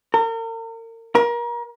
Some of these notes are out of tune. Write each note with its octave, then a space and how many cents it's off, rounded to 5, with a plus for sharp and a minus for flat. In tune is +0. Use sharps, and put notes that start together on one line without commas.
A#4 -40
A#4 +30